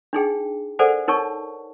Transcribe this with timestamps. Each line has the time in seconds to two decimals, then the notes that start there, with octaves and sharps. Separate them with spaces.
0.13 D4 D#4 G#4 G5
0.79 A4 A#4 C5 D5 F#5 G#5
1.08 D#4 A#4 C#5 A5 C#6